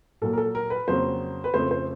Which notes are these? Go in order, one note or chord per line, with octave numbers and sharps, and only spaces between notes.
A#2 F#3 A#3 A4
A#4
A4
A#4
B4
F2 C#3 F#3 A#3 C5
B4
F2 C#3 F3 A3 C5
C5